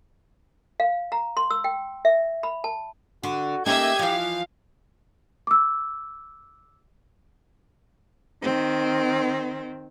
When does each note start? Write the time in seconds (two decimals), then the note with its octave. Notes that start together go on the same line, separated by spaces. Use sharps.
0.80 F5
1.12 A#5
1.37 C6
1.50 E6
1.64 G5
2.05 E5
2.43 B5
2.64 A5
3.23 D3 F#4
3.66 A#3 C#4 D#4 G4 D#5 E5 G#6
3.99 E3 F3 F5
5.47 D6 E6
8.43 D#3 C4